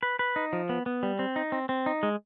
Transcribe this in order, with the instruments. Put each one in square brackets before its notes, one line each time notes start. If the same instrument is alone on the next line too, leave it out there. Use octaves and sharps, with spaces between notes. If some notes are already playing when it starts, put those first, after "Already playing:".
[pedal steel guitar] B4
B4
D#4
F3
B3
B3
G3
C4
D#4
C4
C4
D#4
G#3